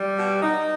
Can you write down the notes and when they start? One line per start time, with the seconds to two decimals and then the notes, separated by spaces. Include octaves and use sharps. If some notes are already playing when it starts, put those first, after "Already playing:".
Already playing: G3
0.16 B2
0.41 B2 D#4